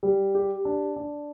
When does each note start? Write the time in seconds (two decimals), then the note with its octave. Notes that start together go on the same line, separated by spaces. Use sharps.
0.03 G3
0.35 G4
0.65 D4
0.96 D4